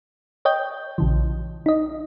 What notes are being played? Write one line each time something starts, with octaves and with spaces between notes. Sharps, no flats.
C#5 D#5 G5 G6
A#1 C#3 E3
D#4 D#5